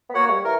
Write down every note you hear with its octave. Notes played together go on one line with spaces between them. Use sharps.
B3
A#3 F#4 C#5 F#5
G3
E3 A#4